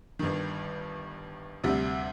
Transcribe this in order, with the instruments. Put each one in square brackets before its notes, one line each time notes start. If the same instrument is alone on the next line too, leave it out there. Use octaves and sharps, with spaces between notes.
[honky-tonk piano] G1 G2 D#3
D2 C3 G3